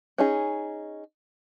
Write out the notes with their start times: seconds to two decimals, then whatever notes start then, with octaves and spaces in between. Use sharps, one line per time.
0.18 C#4 D#4 G#4